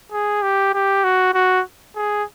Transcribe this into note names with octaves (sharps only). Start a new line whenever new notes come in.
G#4
G4
G4
F#4
F#4
G#4